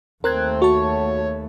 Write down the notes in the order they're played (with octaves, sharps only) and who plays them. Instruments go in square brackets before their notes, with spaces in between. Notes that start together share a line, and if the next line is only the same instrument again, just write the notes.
[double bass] D#2 A3 [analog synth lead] C4 [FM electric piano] A#4 F#6 G#6
[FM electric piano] F#4 A5 [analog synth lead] C#5